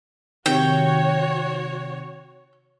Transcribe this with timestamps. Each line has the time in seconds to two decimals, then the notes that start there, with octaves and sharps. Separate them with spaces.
0.46 C3 D#3 F#4 C#5 G5